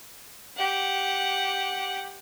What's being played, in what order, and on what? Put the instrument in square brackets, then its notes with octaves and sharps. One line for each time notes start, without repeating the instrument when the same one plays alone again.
[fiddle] G4 F#5